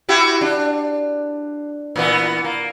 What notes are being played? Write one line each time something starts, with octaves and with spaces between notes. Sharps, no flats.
E4 F#4 G4
D4
A#2 E3 B3
A#3